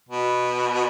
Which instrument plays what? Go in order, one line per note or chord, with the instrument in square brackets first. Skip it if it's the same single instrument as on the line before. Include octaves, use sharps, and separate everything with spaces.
[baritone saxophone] B2